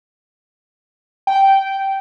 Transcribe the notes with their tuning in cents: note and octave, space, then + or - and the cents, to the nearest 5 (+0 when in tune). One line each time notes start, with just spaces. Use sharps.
G5 -10